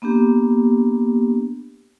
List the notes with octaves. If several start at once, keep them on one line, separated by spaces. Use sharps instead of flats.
A#3 B3 D4 G4